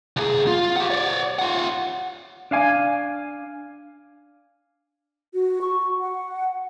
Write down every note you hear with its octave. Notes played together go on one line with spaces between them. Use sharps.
C2 G#4
F4
G4 F#5
C#5 D5
F4 F#5
D4 F5 G#5
F#4
C#6
F#5